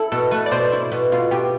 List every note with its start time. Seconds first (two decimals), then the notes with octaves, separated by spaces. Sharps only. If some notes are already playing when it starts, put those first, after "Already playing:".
Already playing: E4 A4
0.12 B2 A4
0.31 A3 B4
0.46 D5
0.51 B2 C5
0.72 E4
0.92 B2
1.12 B2 F4
1.31 B2 G4